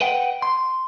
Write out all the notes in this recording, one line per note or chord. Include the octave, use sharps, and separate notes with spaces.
B4 D#5 F#5 G5
C6